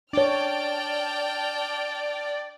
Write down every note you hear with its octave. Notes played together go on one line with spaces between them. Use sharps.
D4 C#5 D5 G5 A5 F6